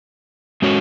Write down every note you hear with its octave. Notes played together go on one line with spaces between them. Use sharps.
G#3 C#4 F#4 C#5